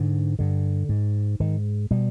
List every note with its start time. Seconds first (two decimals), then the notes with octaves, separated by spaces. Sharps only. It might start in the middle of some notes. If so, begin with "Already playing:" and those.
Already playing: G#2 D3
0.39 G2 D3
0.89 G#2
1.40 G#2 D#3
1.91 B2 G3